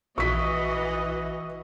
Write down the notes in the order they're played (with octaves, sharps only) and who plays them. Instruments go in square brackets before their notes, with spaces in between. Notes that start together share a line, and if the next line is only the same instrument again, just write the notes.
[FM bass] A#1 [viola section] E3 F#4 D#5 [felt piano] C#6 B6